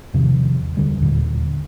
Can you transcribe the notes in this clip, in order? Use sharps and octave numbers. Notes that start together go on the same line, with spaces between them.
E2 C3 D#3 F3
D2 D3 G3
D#2 A#2 D3